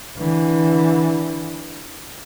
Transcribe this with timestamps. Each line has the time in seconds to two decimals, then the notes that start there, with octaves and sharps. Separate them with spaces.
0.17 D3 E3